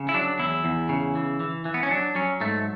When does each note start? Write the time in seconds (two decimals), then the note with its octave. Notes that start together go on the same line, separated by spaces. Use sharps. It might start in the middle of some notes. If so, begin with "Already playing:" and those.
Already playing: C#3
0.09 E4
0.14 F#3 D4
0.39 E2 E4
0.65 E2
0.89 C#3
1.15 E3
1.40 E3
1.65 E3
1.74 B3
1.83 C#4
1.90 F#3 D4
2.15 F#3 C#4
2.40 G#2 A3